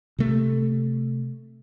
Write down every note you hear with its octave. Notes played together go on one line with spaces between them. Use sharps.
C3 A3